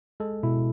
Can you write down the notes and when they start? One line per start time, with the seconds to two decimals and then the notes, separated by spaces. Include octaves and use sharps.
0.20 G#3 A4
0.43 B2 E4